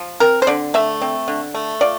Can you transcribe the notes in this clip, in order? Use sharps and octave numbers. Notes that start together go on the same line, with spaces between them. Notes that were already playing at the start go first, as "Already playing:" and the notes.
Already playing: F3
C4 A#4
C5
D3 D5
A3 E5
C4
D3
A3
F4 D5